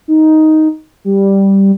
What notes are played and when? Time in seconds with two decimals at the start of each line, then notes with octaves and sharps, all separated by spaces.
0.08 D#4
1.05 G3